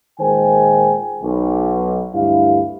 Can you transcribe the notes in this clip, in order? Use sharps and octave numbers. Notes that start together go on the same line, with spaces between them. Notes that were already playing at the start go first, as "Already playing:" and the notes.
A#2 D#3 G#3 C5 G5 G#5
B1
D2 G2 E4 F5